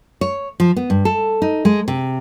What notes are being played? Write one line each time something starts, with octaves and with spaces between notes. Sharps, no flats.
C#5
F3
B3
G2
A4
D#4
G#3
C3